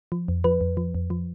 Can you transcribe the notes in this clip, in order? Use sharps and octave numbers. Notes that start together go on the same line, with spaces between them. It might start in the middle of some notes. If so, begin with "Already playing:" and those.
F3
F2
F3 B4
F2
F3
F2
F3